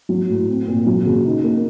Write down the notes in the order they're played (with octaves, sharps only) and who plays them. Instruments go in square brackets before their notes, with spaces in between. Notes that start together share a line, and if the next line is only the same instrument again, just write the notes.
[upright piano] F#3
A2
C4
A#2
F#3
C#3
D#4
A#3